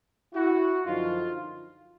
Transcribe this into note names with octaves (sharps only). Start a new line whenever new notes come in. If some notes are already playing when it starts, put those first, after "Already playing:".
E4 F#4
F#2 D3 F3 D#4 F4